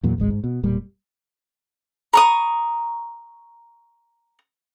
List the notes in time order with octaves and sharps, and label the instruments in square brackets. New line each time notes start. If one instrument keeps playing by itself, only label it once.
[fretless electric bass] E2 A#2 F#3
D1 G#1 G#3
G#2
B2
E1 A#2 G3
[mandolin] A#5 C#6 D#6